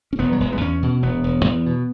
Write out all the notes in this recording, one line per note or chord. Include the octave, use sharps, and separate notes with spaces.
C#4
E1 B3
F#3
E1 G#3
B3
E2 C#4
B2
E1 B3
E1
E2
B2